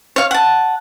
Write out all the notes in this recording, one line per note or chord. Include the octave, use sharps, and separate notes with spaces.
C#5 F5
F#5 A5